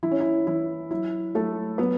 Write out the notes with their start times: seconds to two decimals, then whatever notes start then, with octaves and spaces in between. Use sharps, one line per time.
0.03 E3 E4
0.11 C#4
0.20 E4
0.47 E3 E4
0.91 F#3 E4
1.34 F#3 A3 A4
1.78 F#3 B3 B4